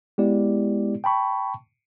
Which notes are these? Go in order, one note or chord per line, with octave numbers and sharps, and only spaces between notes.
G#3 B3 E4 G4 D5
G5 A5 B5 C#6